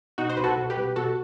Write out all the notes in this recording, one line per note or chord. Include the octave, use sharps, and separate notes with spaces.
B2 D#4 F#4
C5
C2 B4
F#4 A4
B2
G4 B4
C2
B2 F#4 A4